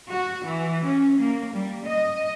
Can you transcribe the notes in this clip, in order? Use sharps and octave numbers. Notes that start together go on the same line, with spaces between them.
F#4
E3
C#4
A#3
G3
D#5